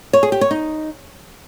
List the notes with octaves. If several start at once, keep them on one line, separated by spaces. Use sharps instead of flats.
C#5
G#4
G4
C#5
D#4